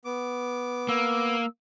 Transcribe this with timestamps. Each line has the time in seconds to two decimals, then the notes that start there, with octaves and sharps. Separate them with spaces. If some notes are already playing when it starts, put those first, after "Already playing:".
0.05 B3 D6
0.89 A#3 E6